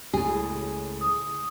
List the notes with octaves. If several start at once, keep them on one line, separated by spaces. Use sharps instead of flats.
C#2 A2 G#4
D#6